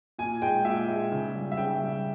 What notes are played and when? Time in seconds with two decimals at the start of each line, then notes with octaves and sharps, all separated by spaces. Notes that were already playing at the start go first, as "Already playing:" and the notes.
0.19 A#2 G#5
0.42 G#3 G5
0.65 A#2 E5
0.88 G#3
1.12 C#3
1.35 G3
1.52 E5
1.57 C#3 G5
1.81 G3